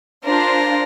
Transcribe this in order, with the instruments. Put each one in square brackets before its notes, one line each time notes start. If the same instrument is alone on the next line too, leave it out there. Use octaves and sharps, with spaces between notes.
[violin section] D4 F4 C5 [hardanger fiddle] A#4